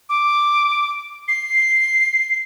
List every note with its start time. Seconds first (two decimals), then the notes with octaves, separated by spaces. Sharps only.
0.09 D6
1.28 C7